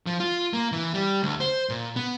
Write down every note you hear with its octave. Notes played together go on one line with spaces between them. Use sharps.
F3
F4
A#3
E3
G3
D2
C5
A#2
B3